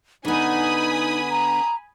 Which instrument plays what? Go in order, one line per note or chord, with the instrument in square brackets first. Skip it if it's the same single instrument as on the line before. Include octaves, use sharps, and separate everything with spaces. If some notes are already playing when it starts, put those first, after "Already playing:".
[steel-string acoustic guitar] D3 B3 [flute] D#4 [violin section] G#5 B5 D#6
[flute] A#5